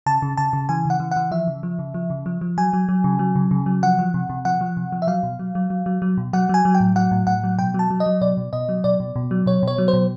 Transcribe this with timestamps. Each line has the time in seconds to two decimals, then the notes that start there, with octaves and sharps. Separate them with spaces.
0.06 C#3 A5
0.22 C#3
0.37 C#3 A5
0.53 C#3
0.69 E3 G#5
0.85 C#3 F#5
1.00 E3
1.11 E3 F#5
1.31 F3 E5
1.48 C#3
1.63 F3
1.79 C#3
1.94 F3
2.10 C#3
2.26 F3
2.41 F3
2.58 F#3 G#5
2.73 F#3
2.89 F#3
3.04 C#3
3.19 F#3
3.36 C#3
3.51 C#3
3.66 F#3
3.83 F3 F#5
3.99 F3
4.14 C3
4.30 C3
4.45 F3 F#5
4.61 F3
4.77 C3
4.92 F3
5.02 E5
5.07 F#3 F5
5.23 B2
5.39 F#3
5.55 F#3
5.70 F#3
5.86 F#3
6.02 F#3
6.17 B2
6.33 F#3 F#5
6.49 F#3 G#5
6.65 F#3
6.74 G5
6.80 A2
6.96 F#3 F#5
7.11 A2
7.27 A2 F#5
7.44 F#3
7.59 B2 G5
7.74 F#3 A5
7.90 F#3
8.00 D#5
8.06 F#3
8.21 B2 D5
8.37 B2
8.53 B2 D#5
8.69 F#3
8.84 B2 D5
9.00 B2
9.16 B2
9.31 F#3
9.46 B2 C#5
9.63 B2 C#5
9.78 F#3
9.88 C5
9.93 B2